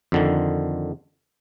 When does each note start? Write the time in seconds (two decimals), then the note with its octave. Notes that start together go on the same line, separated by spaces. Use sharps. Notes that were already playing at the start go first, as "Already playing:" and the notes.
0.12 F2 D3 D#3